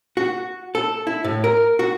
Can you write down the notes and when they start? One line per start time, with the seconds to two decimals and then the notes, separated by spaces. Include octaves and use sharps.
0.17 F#4
0.75 A4
1.07 E4
1.24 A2
1.44 A#4
1.79 F#4